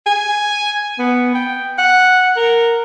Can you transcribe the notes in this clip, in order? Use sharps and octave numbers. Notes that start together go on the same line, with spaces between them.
G#5
B3
G5
F#5
A#4